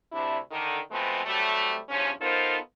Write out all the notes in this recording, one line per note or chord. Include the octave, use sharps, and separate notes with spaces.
D2 C3 D4 E4
D3 D#3
B2 F3 G#3 A3 B3 C4
C3 F#3 G3 A3
E2 G2 F3 C#4
B3 D#4 F4 A4 A#4 C5